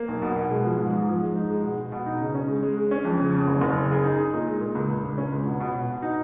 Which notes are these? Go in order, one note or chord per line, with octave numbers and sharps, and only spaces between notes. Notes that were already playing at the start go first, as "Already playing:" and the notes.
Already playing: A#3
B1
B2
B2
G#3
F3
G#2
G#2
F3
G#3
D#4
G#3
B2
B2
B2
D#4
C#3
C#4
G#3
G#3
G#3
C#4
F2
C#3
C#3
F#1
F#1
C#3
G#4
D#4
D#4
A#2
G#3
A#2
C#2
C#2
C#2
C#4
C#2
B2
B2
B2
B2
D#4